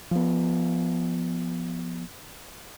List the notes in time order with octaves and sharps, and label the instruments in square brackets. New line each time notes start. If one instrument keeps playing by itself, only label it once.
[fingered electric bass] F3 B3